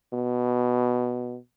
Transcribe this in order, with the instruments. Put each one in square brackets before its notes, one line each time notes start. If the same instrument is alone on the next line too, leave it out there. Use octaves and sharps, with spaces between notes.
[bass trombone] B2